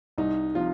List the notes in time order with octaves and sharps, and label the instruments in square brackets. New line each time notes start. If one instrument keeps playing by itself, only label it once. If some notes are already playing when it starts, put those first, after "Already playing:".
[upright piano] C2 D#4
C3 F3 F4